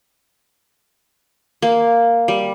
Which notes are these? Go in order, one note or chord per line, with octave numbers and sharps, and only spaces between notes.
A#3
G3